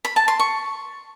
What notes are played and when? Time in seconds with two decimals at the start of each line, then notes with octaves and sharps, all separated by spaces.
0.05 B5
0.16 A5
0.28 C6
0.39 C#6